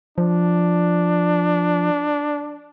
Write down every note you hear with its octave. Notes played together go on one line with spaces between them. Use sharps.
F3 D4